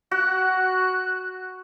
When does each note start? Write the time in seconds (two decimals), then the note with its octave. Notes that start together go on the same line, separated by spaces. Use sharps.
0.11 F#4 F#6